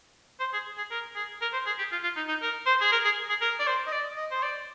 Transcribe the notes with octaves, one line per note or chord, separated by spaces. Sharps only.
C5
G#4
G#4
A#4
G#4
A#4
C5
G#4
G4
F4
F4
D#4
D#4
A#4
C5
G#4
A#4
G#4
G#4
A#4
D5
C5
D#5
D5
D#5
C5
D5